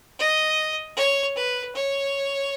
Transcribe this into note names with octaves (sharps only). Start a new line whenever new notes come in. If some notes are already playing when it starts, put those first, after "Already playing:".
D#5
C#5
B4
C#5